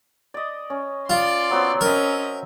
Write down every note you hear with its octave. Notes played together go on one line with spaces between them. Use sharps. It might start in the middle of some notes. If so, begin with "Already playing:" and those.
D5 D#5
C#4
F4 D5 C6
F#3 B3 C4
C#4 A#4 C5 D#5 E5